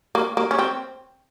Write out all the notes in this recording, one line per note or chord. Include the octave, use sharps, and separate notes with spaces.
A#3
A#3
C#4
C4